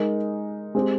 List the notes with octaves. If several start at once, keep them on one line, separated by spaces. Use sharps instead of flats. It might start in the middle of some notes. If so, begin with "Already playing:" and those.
Already playing: G#3 D#4 A#4
G#3 C4 G4